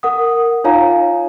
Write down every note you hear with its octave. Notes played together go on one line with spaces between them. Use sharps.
A#4 F#5 D#6
D#4 F4 C#5 F5 A#5